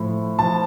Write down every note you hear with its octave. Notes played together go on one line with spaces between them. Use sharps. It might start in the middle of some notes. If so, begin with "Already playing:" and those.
Already playing: A2 F3
F3 A5